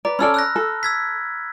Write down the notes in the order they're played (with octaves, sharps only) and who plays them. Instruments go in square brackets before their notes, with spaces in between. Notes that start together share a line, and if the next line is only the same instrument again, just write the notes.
[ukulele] B4 D5 [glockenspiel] A#5
[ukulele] C#4 A4 D5 [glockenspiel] B5 E6 F6
[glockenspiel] E6 F#6 A#6
[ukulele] A4
[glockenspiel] E6 G#6 B6